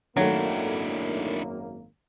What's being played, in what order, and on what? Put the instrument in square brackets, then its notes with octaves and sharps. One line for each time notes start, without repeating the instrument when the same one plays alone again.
[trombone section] G#1 F#2 A#3 [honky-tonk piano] D#3 A3 [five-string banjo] F#3 [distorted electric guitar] D4 E4